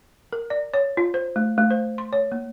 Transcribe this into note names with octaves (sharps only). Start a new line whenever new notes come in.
A#4
D5
C#5
F4
C5
A3
A3
C5
C6
C#5
A#3